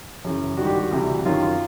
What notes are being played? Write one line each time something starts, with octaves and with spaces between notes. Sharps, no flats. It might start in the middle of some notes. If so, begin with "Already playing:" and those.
F#2 C#3 E3
G2 D#3 G#3 F#4
G4
F#4
D2 C3 E3 G3
F#2 D#3 F#3 F4
F4